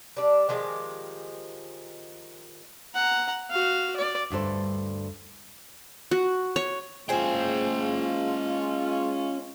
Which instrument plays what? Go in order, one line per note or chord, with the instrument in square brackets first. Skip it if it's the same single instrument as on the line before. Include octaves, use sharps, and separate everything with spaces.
[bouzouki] G3 D4
D#3 F3 G#3 G4
[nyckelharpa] F#5 A#5
F#4 F5
D5
[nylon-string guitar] D2 G2 A4 C5
[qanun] F#4
C#5
[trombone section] G#3 F4 [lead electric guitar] C#4 G5 [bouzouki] G#4 C5